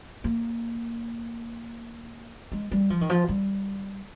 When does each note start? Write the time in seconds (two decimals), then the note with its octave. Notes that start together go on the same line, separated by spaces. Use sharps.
0.24 A#3
2.52 G#3
2.71 G3
2.90 F3
3.01 D#3
3.09 F3
3.28 G3